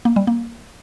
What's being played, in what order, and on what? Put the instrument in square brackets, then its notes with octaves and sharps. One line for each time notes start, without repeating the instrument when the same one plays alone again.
[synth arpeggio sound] A#3
G3
A#3